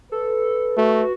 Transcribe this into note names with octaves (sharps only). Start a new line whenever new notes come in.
A4 B4
A3 F#4